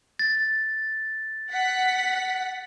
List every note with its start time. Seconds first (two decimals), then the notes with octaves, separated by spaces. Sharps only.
0.19 A6
1.50 F#5 B6